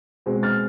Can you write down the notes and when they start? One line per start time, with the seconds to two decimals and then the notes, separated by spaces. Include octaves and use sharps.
0.26 B2 G#3 C4
0.43 F6 A6